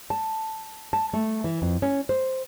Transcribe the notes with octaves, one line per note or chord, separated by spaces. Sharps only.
A5
A5
A3
E3
F2
C#4
C5